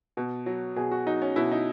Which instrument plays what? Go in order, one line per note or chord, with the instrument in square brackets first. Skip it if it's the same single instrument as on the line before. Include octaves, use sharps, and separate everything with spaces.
[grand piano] B2
F#3
B2 G#4
F#4
F#3 D#4
C#4
B2 E4
D#4